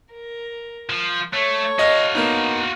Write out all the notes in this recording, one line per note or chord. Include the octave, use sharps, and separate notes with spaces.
A#4
F3
A3 A4 C#5
F#4 D#5 F5
A#3 B3 D#4